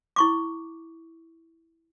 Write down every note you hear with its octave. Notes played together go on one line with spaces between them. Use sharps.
E4 C#6 D6